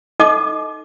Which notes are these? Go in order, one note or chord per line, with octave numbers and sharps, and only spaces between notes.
D#4 A4 D#5 D6